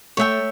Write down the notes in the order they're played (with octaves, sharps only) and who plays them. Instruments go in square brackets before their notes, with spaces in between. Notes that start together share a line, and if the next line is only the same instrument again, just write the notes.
[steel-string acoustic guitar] A3 [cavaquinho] C#5 E5 G5